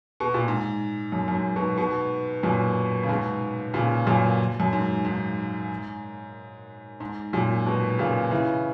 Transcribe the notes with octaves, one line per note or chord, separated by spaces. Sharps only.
B2
A#2
G#2
F#2
F#2
G#2
G#2 B2
G#2 B2
F#2 A#2
C#3
G#2 B2
A#2 C#3
F#2 A#2
F#2
G#2
G#2
G#2
F#2 A#2
G#2 B2
A#2 C#3
C#3 E3